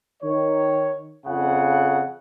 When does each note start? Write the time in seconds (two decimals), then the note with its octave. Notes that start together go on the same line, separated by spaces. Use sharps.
0.23 D#3 C#5
1.26 F2 C#3 F#5